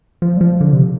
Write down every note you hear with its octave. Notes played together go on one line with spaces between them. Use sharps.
F3
G3
F3
D3
C3